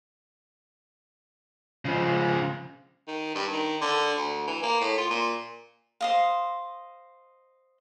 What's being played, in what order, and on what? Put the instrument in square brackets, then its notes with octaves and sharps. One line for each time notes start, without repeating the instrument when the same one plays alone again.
[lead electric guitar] C#3 F3
[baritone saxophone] D#3
G2
D#3
D3
D2
E3
A#3
A2
F4
A#2
[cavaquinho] C5 D#5 F5